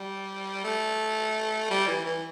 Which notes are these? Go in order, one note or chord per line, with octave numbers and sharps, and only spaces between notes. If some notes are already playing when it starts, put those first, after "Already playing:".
Already playing: G3
A3
G3
E3
E3